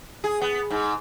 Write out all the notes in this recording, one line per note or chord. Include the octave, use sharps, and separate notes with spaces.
G#4
B3
G#2